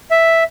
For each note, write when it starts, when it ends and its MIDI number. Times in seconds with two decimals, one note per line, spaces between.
0.11 0.44 76